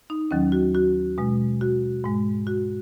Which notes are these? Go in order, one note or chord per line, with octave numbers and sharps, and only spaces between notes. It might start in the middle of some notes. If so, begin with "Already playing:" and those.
D#4
D#2 D#3 F#3 C#4
F#4
F#4
B2 G#3
F#4
G#2 G#3
F#4